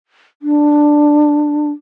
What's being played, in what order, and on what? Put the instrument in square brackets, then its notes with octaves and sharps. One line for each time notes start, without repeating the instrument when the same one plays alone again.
[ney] D4